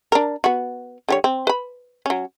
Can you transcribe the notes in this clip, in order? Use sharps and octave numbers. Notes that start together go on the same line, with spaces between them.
D4 A#4
B3 F#4
D3 G3 C#5
C4
B4 B5
F#3 C#4